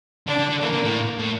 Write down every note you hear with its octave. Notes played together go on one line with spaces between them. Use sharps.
D3 D4
D3
D3
E3 A#3
D3
A2
A2